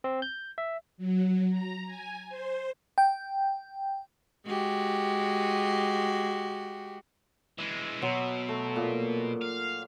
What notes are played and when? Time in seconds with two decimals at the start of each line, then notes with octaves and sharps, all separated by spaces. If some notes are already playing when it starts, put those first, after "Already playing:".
0.04 C4
0.22 G6
0.58 E5
0.98 F#3
1.50 A#5
1.86 G#5
2.29 C5
2.98 G5
4.45 G#3 F#4 G4
7.58 E3 G#3 E5
8.02 B2 F#3 E5 C6
8.49 A3
8.76 A#2
9.42 F5